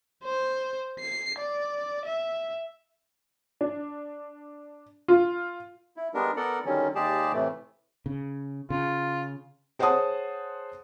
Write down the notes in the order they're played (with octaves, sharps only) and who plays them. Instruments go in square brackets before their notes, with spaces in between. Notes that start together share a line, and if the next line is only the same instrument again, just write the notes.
[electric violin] C5
C7
D5
E5
[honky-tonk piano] D4
F4
[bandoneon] E4
G3 G#3 B3 D4 A#4
B3 A4 A#4 D5 F#5
D3 D#3 F#3 G3 C#4
D#2 G#3 G4 G#4 D5 A5
A2 C3 E3 A3
[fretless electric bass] C#3
[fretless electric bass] C#3 [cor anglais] F4
[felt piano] G#4 C5 C#5 F#5 A5 D#6